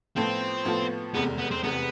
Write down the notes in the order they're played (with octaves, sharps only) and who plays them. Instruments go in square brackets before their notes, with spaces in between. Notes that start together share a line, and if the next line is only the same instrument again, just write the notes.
[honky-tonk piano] A2 F3 B3 F4 A4 [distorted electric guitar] C4
[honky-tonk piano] A2 F3 B3 F4 A4
[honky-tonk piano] F1 E2 C3 G#3 [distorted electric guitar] B3
[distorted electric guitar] B3
C4
[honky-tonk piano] F1 E2 C3 G#3 [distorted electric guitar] B3